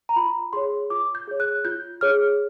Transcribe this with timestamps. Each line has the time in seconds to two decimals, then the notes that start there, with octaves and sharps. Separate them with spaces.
0.09 A#5
0.16 F4 B5
0.53 G#4 C#5 C6
0.90 F4 D6
1.15 G6
1.28 G#4 C#5
1.40 F#6
1.65 F4 G6
2.01 G#4 C#5 F6